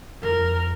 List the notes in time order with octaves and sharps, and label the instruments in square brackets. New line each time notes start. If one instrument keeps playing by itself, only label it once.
[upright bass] F2 [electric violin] A#4